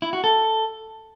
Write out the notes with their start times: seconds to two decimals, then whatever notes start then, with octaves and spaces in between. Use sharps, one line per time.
0.02 E4
0.13 F#4
0.24 A4